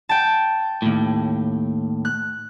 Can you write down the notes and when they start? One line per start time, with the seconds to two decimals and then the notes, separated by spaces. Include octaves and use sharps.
0.09 G5 A5
0.82 D#2 A2
2.05 F#6